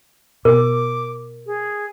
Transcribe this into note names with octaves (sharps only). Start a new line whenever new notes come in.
B2 A#4 D6
G#4